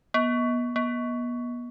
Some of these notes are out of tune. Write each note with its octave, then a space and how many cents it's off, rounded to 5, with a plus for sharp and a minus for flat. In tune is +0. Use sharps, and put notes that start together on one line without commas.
B3 -30
B3 -35